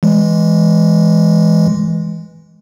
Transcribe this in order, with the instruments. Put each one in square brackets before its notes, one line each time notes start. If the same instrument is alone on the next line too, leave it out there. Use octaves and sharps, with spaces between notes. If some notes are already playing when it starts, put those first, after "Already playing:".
[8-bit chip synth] E3 G#3